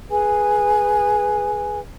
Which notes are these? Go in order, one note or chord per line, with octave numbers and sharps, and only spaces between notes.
G#4 B4 G#5